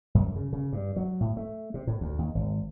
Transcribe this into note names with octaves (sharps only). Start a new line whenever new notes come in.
F#2
C#3
C#3
G2
F#3
A2
A3
C3
A2
D2
D#2
G#1